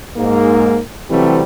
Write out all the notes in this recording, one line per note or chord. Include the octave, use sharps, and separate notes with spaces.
G#2 A#3
C3 E3 F#3 G3 A3 C4